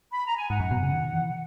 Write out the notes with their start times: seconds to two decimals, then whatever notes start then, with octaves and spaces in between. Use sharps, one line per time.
0.12 B5
0.25 A#5
0.37 G#5
0.50 G#2 F#5
0.60 F#2
0.71 B2
0.82 C#3
0.92 D#3
1.13 E3